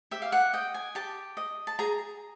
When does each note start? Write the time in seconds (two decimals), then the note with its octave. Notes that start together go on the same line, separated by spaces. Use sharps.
0.11 G4 E5
0.22 F5
0.32 F#5
0.53 D#5 G5
0.74 G#5
0.95 G4 A5
1.37 D#5
1.67 A5
1.79 G#4 A#5